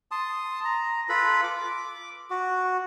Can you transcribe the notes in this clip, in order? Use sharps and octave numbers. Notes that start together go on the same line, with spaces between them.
A5 C6 D#6
A#5
F4 A4 B4 B5
D6
F#4